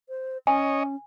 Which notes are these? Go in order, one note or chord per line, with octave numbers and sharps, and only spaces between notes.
C5
C#4 C#5 D#5 G#5